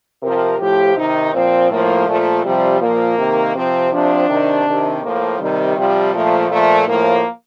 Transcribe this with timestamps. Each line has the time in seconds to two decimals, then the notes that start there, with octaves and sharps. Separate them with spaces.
0.22 C3 F3 A#4
0.59 A2 F3 G4
0.96 C3 D#3 D#4
1.33 A#2 F3 C4
1.70 A2 F3 A#3
2.07 A#2 F3 A3
2.44 C3 F3 G3
2.81 A#2 F3 A#3
3.18 C3 D#3
3.55 C3 F3 C4
3.92 C3 F3 D4
4.28 C3 D#3
4.65 C3 D#3
5.03 A2 F3 A#3
5.39 C3 D#3 G3
5.76 C3 F3 G3
6.13 A#2 F3 A3
6.50 A#2 F3 A3
6.87 A2 F3 A#3